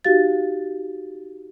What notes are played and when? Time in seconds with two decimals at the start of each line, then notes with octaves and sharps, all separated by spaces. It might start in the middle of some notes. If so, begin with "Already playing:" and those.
0.05 D#4 F#4 G4 F5 A6